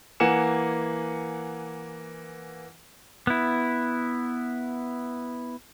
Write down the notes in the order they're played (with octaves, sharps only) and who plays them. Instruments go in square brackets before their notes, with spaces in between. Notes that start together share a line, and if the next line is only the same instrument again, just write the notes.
[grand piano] E3 A#3 F#5 G#5 C#7 E7
[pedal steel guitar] B3 E4